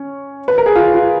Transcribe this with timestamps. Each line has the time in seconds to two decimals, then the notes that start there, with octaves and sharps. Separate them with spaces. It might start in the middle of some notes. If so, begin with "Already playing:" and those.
Already playing: C#4
0.48 B4
0.58 A#4
0.66 G#4
0.76 F4
0.94 F4